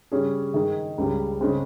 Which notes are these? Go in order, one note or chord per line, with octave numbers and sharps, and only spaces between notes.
C#3 G3 C#4 G#4
D#3 G#3 D#4 G#4
C#2 C#3 G3
C#3 G#3 C4